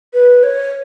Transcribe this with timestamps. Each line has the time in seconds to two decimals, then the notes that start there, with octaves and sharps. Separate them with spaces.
0.13 B4
0.43 C#5